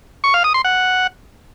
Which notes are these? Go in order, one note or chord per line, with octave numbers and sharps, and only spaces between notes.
C#6
F5
D#6
C6
F#5